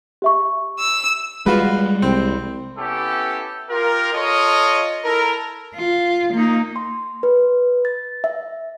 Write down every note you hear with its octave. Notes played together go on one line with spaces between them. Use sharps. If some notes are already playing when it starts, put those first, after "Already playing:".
G4 E5 C#6
E6
G3 G#3 F4 F#4 B4
C2 C4
B3 C#4 E4 G4 A4
F4 G4 A#4
F4 A4 C#5 D#5
E4 A4 A#4
F4
A#3 D#4
C6
B4
A6
E5